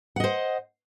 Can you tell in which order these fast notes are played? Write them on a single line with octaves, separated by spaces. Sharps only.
F#5 D#5 C5